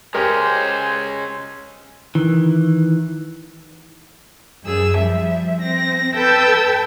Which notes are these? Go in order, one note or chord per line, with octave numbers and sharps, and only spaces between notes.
G#3 C#4 G4 A#4 C5 G#5
D#3 E3
F#2 G#4 E6
F3 G3 E5
C4 A#6
A4 B4 G5 A5 E6 G6